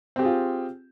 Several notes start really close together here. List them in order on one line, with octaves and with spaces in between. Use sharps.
C4 G4 G#4 F4